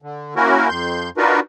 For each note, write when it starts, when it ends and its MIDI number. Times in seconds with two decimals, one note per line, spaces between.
0.02 0.34 50
0.36 0.68 58
0.36 0.68 61
0.36 0.68 64
0.36 0.68 66
0.36 0.68 70
0.69 1.10 41
0.69 1.10 84
0.69 1.10 91
1.17 1.40 62
1.17 1.40 63
1.17 1.40 65
1.17 1.40 66
1.17 1.40 70
1.17 1.40 71